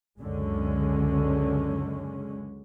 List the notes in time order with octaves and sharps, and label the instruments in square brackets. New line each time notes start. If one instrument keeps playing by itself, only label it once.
[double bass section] C#2 F#2 D3 G#3 C#4